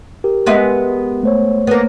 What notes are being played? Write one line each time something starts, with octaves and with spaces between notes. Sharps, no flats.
G4 A#4
G#3 B3 E5
A3 C5 C#5
A#3 B3